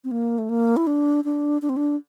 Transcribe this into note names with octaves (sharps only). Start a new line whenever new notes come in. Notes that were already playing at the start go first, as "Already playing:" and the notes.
C4
A#3
A3
A#3
E4
D4
D4
D4
C4
D4